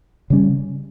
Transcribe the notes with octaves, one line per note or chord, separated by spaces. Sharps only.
C#3 G3 C#4